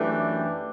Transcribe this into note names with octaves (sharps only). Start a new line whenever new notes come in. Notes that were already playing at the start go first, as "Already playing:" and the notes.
Already playing: F#2 E3 A3 D4 G4